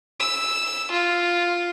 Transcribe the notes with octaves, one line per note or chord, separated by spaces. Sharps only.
E6
F4